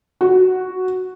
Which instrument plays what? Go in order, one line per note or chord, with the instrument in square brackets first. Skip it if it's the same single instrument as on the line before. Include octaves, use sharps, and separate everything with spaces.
[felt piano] F#4